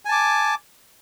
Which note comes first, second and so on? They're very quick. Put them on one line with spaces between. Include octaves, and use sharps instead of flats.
G#5 A5 D6